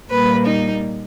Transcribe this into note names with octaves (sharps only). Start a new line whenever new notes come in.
A#2 G3 A#3 B4
D#4